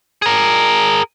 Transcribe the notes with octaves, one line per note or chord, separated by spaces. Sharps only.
G#4 A#4